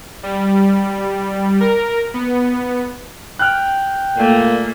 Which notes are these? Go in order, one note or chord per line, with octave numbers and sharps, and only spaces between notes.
G3
A#4
B3
G5 F6 F#6
A#2 A3 A#3